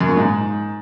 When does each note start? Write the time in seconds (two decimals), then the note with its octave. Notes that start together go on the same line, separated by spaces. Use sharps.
0.01 F#2
0.09 A#2
0.17 G#2